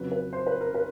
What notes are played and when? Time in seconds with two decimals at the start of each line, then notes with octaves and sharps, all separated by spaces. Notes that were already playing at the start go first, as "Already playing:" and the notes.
Already playing: F2 C#3 F#3 B4
0.12 B4
0.33 C5
0.46 B4
0.61 A#4
0.75 B4